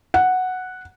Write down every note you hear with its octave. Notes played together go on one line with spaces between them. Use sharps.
F#5